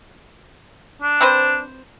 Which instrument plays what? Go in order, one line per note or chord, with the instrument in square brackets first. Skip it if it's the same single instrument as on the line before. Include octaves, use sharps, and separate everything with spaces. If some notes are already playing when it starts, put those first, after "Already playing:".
[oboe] D4
[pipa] C4 B4 C5